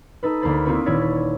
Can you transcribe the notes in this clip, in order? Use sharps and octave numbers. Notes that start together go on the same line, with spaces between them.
D#4 A4 B4
D2 A#3 A#4 C5 B5 A6
A#3 C4 D#4 E4 F#4 B4
D#1 E4 C#5 D5 B6